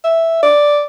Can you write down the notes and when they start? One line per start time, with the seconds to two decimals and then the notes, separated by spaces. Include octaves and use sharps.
0.04 E5
0.43 D5